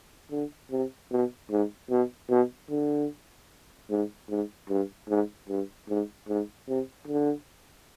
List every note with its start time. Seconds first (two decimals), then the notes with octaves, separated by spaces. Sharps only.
0.31 D3
0.71 C3
1.11 B2
1.51 G#2
1.90 B2
2.30 B2
2.70 D3
3.90 G#2
4.29 G#2
4.69 G2
5.08 G#2
5.49 G2
5.89 G#2
6.28 G#2
6.68 C3
7.08 D3